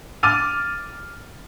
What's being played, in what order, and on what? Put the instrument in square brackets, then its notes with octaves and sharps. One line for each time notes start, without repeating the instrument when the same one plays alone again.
[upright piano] D6 F6 A6 D#7